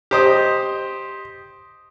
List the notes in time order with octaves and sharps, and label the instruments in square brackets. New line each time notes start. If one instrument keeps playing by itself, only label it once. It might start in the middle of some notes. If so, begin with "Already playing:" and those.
[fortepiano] G4 C5 D#5